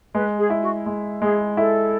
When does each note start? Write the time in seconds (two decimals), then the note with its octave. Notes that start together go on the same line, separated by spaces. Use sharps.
0.14 G#3 B4
0.38 G#4
0.50 E4
0.62 F#4
0.86 G#3
1.22 G#3 G#4
1.57 E4 A4